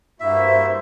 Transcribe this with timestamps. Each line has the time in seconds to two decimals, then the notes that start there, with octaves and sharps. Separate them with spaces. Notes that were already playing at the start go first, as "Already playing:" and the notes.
0.20 G2 A#3 E4 F#4 C5 E5